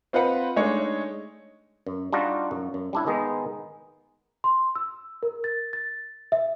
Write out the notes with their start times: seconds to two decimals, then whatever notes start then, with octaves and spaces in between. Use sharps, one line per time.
0.13 C4 F4 B4 D#5 F#5 B5
0.56 G#3 A3 D4 D#4 C#5
1.87 F#2
2.13 G3 D4 D#4 F4 F#4
2.51 F#2
2.74 F#2
2.93 G3 D4 E4
3.07 D#3 G#3 B3 D#4
4.44 C6
4.75 E6
5.23 A#4
5.44 A6
5.73 A6
6.32 E5